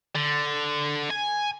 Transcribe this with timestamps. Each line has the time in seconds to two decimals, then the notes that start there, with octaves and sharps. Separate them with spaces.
0.15 D3
1.10 G#5